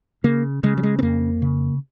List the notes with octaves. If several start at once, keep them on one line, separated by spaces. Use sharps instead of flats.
C#3 A#3
C#3 G#3
F#3
G#3
C4
F2 A#3
C#3